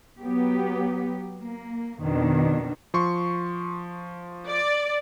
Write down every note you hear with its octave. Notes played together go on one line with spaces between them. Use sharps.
F#3 B3 G4
A#3
F2 B2 D#3 D4
F3 C6 C#6
D5